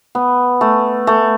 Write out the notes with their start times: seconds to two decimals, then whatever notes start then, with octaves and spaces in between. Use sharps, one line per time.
0.15 B3
0.61 A3
1.07 A3